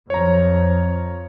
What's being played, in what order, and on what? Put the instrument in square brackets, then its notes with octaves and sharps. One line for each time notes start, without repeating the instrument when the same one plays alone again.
[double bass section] F2 F3 [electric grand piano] C#5 A#5